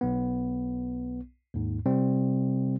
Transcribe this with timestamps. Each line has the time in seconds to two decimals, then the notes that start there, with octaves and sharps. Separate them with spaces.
0.01 B1 B3
1.54 D#2 G#2
1.86 C3 G3 C4